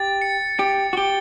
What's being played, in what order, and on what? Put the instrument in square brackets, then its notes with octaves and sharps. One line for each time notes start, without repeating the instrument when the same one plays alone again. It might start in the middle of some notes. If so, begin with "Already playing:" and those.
Already playing: [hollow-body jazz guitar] G4 [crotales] A6
[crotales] C#7
[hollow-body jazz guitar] G4 [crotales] A6
[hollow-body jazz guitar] F#4
[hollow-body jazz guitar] G4 [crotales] G7